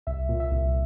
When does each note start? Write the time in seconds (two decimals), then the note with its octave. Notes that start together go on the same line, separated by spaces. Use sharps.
0.07 C2 E5
0.29 A#2
0.40 E5
0.51 C2